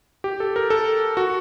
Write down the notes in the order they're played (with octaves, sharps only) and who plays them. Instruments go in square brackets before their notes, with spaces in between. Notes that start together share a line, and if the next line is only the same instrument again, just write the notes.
[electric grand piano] G4
A4
A#4
A4
F#4